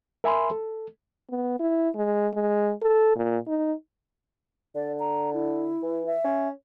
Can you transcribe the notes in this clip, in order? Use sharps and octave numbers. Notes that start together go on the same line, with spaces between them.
A#4 E5 G#5 B5 C6
A4
B3
E4
G#3
G#3
A4
A#2
D#4
D3 D5
A#5
E4
E3
E5
C#4